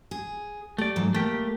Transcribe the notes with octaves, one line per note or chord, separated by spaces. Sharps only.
G#4
A3 G4 D5
G#2 E3 F#3
A3 A#3 G4